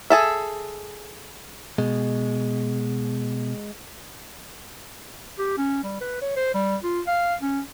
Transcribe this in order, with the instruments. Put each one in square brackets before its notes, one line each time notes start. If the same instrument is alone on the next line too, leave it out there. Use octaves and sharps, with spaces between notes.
[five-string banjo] G#4 A4 E5
[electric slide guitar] B2 [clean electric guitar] G#3
[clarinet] G4
C#4
G3
B4
C#5
C5
G3
F4
F5
C#4